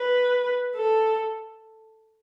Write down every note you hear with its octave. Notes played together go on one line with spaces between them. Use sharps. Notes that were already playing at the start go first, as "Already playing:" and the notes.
Already playing: B4
A4